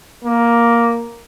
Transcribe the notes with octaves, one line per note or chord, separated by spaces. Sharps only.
A#3